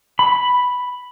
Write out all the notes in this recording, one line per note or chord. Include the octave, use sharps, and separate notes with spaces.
B5